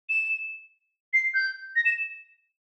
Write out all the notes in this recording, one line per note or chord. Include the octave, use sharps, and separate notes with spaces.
E7
C7
G6
A#6
E7